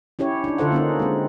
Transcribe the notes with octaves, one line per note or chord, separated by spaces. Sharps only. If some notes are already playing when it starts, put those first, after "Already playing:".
C#4 E4 G4 C#5
D4 D#4
D3 F4 A4 C5 F#5
A#3 C#4 D#4
G#3 C4